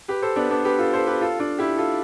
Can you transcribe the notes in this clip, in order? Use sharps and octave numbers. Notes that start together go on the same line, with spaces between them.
G4 B4
A4 C5
B3 D4
B3 D4
G4 B4
F4 A4
A4 C5
G4 B4
F4 A4
D4 F4
E4 G4
F4 A4